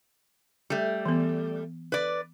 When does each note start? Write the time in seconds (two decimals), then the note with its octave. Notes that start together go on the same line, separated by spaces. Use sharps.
0.70 G3 A3
1.06 E3 B3
1.92 B4 D5